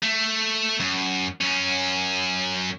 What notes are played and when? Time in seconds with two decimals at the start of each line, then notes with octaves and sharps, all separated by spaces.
0.03 A3
0.80 F#2
1.41 F#2 C#4